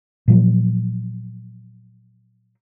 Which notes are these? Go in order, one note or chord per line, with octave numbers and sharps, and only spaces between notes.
A#2 F3 F#3